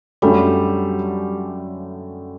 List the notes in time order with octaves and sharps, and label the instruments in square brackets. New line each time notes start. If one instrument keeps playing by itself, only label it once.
[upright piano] F#2 D3 F#3 A3 C#4 [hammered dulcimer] G3